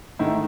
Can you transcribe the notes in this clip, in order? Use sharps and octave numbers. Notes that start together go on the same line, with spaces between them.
G#2 D#3 A3 E4